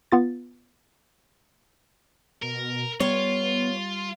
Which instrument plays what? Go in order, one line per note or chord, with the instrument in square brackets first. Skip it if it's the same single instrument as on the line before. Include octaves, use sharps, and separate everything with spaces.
[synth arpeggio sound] B3 F4 A6
[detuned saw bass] B2 [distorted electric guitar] A#4
[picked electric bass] G3 [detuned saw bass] B3 [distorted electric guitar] F4 [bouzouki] C#5